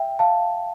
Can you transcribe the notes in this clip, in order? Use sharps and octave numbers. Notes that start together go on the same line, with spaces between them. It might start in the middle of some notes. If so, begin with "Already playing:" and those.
Already playing: E5 G5
F5 A5